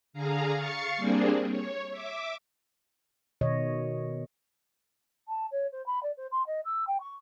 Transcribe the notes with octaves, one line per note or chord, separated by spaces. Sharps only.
D3 G#4 F5 A#5
F5 C#6 A6 C7 C#7
G3 A#3 C4 D4 G#4
C#5
E5 D6
B2 D#3 C#5 D#5
A5
C#5
C5
B5
D5
C5
C6
D#5
E6
G5
C#6